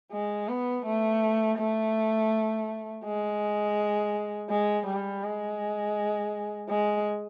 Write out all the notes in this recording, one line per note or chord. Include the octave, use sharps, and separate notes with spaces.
G#3
B3
A3
A3
G#3
G#3
G3
G#3
G#3